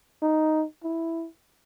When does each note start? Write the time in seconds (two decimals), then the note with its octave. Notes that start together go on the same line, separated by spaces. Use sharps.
0.22 D#4
0.84 E4